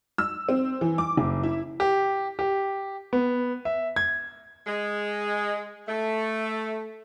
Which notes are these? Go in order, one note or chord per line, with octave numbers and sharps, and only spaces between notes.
E6
C4
E3
D6
F#1
E4
G4
G4
B3
E5
G#6
G#3
A3